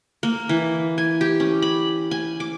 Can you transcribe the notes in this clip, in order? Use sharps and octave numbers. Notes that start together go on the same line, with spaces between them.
A#3
E3
G#5
G4
C#4
B5
G#5
D6